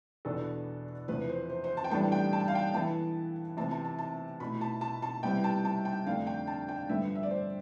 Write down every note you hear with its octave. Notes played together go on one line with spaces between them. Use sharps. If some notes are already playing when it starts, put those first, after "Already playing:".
E2 B2 B3 D4 A4
E2 C3 F3 B4
C5
C5
C5
A5
G5
A2 E3 G3 B3 D4 A5
G5
A5
G5
F5
G5
E3 B3 E4 A5
C3 E3 B3 A5
A5
A5
A5
B2 A3 E4 B5
A5
A5
A5
C3 G3 B3 E4 G5
A5
A5
G5
F2 D3 A3 D4 F5
G5
A5
G5
G2 D3 F3 B3 E5
E5
D5
C5